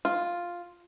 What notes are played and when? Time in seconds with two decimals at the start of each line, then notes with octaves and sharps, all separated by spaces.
0.05 F4